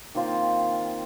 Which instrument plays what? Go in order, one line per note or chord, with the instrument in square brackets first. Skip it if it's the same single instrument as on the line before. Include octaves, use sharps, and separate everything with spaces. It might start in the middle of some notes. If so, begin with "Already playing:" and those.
[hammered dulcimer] D#3 A#3 C4 F4